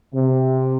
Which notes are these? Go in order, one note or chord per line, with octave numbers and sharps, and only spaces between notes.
C3